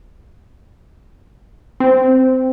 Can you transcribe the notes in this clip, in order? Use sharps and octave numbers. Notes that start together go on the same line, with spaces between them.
C4